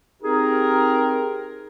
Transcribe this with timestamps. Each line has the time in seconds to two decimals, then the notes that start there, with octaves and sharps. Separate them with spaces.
0.23 C4 D#4 G4 G#4 A#4